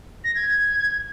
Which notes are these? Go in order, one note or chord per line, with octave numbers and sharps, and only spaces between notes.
A#6
G#6